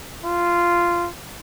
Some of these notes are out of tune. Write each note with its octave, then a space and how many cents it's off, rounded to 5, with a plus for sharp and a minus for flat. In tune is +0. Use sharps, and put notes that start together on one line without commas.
F4 -10